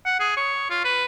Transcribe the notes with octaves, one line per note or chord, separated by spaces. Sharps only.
F#5
G#4
C#5
F4
B4